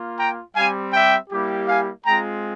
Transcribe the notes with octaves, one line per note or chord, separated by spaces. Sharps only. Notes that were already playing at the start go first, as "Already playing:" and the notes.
Already playing: A#3 F4
G5 A#5
G3 C4 G4 F5 G#5
E5 G5
G3 A#3 E4 G4
F5 G#5
G#3 C4 F4 G5 A#5